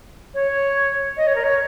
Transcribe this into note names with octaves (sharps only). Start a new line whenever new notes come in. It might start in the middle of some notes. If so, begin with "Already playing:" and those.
C#5
D#5
C#5
A#4
C#5